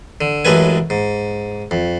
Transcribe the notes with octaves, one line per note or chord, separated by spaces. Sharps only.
D3
A1 F#2 G#3 A3 B4 G#5
G#2
F2